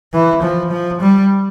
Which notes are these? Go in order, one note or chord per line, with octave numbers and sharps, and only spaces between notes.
E3
F3
F3
G3